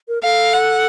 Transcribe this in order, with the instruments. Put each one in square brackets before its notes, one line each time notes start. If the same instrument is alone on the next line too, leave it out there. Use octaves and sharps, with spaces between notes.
[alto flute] A#4
[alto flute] A4 [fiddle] F5
[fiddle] F#5